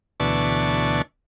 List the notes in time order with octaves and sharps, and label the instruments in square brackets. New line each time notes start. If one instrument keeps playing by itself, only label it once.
[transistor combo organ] D2 B2 E3 D5 A5 C#6